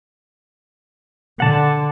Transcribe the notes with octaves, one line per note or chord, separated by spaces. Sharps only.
D3 F#5 A5